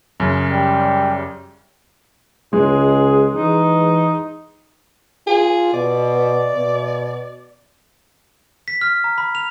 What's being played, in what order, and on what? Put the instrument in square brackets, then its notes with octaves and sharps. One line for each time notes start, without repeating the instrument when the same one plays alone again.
[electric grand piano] F#2 C#3
[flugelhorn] G3
[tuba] C#2 [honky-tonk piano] G#3 [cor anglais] G#4
[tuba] E3 [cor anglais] D#4
[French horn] F4 [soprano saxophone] G#4
[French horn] B2 [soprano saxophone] D5
[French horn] B2
[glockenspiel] B6
F6
A#5
B5
F7